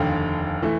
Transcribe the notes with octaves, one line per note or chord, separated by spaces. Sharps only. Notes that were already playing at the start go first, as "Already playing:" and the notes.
Already playing: F1 D#2 D3 F5 G5
E3 A3